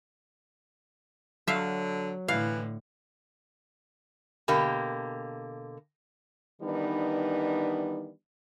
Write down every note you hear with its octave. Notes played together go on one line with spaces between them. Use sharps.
D3 F#3 E5 F5
A2 D3 E3 F5
B2 D3 A#3 G4
D#3 E3 G3 B3 D4 D#4